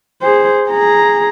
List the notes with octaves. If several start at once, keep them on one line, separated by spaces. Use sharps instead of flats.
G#4 C5
G#4 A#5